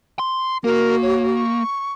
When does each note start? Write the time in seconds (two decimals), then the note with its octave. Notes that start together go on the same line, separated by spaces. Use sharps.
0.19 C6
0.64 A#3 F#4 A#4
1.02 C#5
1.35 C#6